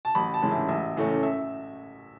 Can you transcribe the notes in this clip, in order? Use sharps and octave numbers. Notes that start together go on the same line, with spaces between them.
A5
A1 B5
A5
G#2 E3 G#3 C#4
E5
A1 E5
A2 E3 A3 C#4
E5